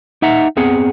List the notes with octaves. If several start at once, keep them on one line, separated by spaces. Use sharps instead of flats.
D#4 E5 F#5 A#5
B3 C4 G#4 F#5